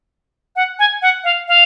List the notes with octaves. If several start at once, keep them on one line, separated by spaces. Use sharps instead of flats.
F#5
G#5
F#5
F5
F5